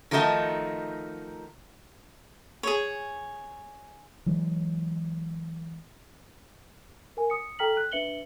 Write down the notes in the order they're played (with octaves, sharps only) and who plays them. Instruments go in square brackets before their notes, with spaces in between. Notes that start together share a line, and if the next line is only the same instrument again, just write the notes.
[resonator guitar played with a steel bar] D#3 F3 A3 D#4 F#4 D#5
[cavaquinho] G#4 C#5
[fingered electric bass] E3 F#3 G#3
[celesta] A#4 G#5
D#6 C#7
A4 G5 A#5 F6 B6 F#7
F#6
D4 B4 E5 C#7 F#7 G7